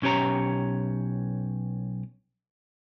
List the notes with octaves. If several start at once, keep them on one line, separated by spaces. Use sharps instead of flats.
B1 C#4 G4 C#5 A#5